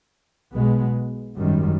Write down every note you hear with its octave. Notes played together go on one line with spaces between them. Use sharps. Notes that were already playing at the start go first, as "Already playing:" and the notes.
B1 B2 G#3 B3
G#1 F#2 D#3 G3